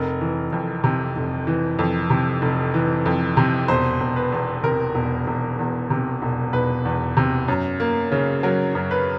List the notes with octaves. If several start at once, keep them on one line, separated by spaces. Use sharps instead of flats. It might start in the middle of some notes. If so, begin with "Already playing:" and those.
Already playing: F1 A#4
E3
F2
C3
F1
E3
F2
C3
F1
E3
F2
C3
E1 C5
E1
B4
E2
C3 A#4
E1
E1
E2
C3
E1
E1 B4
E2
C3
F#2
A#3
C#3
F#3 A#4
F#2
B4